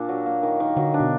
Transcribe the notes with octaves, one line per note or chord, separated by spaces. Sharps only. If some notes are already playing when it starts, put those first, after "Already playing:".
Already playing: A#2 D4
F#3
A#3
D#3
D#3
D3 F#3
D4
B2